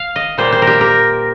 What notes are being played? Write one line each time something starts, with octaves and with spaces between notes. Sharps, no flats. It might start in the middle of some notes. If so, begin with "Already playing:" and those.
Already playing: F5
D#5
A#2 G3 A#3 C5
C5
A#4
G4
A#4